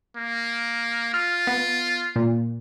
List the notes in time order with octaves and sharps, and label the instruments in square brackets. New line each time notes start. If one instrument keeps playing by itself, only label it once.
[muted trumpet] A#3
[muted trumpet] F4 [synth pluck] F6
[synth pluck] B3
A#2